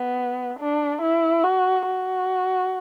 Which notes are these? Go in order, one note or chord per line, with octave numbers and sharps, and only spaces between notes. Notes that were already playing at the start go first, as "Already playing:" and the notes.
Already playing: B3
D4
E4
F#4
F#4